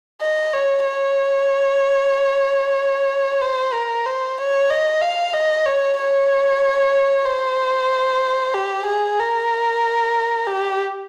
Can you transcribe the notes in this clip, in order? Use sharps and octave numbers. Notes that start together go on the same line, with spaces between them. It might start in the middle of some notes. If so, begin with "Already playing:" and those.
D#5
C#5
C#5
C5
A#4
C5
C#5
D#5
F5
D#5
C#5
C#5
C5
G4
G#4
A#4
G4